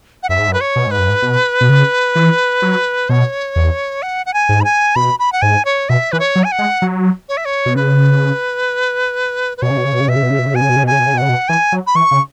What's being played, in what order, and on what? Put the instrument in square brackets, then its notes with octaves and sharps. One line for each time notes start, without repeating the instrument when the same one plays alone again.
[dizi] F#5
[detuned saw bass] F#2 [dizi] E5
[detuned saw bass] G#2
F#2
[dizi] B4
C#5
[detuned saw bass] B2
[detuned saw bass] G#2 [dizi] B4
[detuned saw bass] F#2
G#2
B2
B2
C#3
E3
F#3
[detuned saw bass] B2 [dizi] C#5
[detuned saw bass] E2
[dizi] F#5
F#5
G#5
[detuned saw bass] G#2
[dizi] B5
G#5
[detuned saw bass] B2 [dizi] B5
[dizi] B5
F#5
[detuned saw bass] G#2 [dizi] G#5
[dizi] C#5
[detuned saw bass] B2 [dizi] E5
[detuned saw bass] E3 [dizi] B4
[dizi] C#5
[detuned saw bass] F#3
[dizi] G#5
F#5
[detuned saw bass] G#3
F#3
[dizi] C#5
E5
C#5
[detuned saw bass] B2
[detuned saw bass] C#3 [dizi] B4
[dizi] B4
[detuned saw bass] B2 [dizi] C#5
[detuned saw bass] C#3
B2
C#3
B2
C#3
[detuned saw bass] B2 [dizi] E5
[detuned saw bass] C#3
B2
C#3
B2
C#3
[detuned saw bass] B2 [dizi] G#5
[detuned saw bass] C#3
B2
C#3
B2
[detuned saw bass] C#3 [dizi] G#5
[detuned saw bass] B2
C#3
B2
[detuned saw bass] C#3 [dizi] F#5
[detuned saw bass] B2
[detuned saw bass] E3 [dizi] G#5
[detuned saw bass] F#3
[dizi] B5
[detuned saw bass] E3 [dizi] C#6
[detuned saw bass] C#3